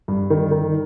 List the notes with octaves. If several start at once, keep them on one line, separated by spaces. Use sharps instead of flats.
G2
D#3
D#3